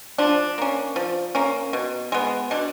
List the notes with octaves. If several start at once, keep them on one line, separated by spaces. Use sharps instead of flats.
F3 D4
A#3 C#4
F3
A#3 C#4
B2
G#3 B3
B2 D4